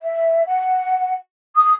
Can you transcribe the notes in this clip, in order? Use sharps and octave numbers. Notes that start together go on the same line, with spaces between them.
E5
F#5
D#6